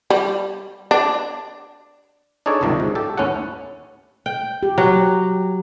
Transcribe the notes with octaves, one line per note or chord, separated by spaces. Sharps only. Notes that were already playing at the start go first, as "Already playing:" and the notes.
G3
D4
D4 D#4 G#4 A4 C#5 D5
G1 C#2 C3 D#3 F3
G#2
G4 A4
D#2 A2 C#4 E4 A4 F#5
G5
G4
F#3